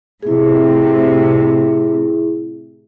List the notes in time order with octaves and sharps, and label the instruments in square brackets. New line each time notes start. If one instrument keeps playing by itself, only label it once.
[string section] A2 C3 [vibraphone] E4 G#4